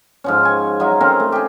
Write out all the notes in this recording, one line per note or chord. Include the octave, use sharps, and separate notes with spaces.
G#2 F3 C#4
G#5 C#6
F#3 F4 D#5 E5
C4 C#4 F4 A#4
A3
G4 G#4